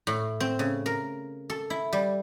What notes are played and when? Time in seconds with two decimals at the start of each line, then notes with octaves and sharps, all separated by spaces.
0.07 A2
0.40 C4
0.59 C#3
0.86 A#4
1.50 A4
1.70 E4
1.93 G3